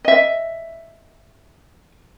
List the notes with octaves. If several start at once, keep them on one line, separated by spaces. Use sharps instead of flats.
D#5 E5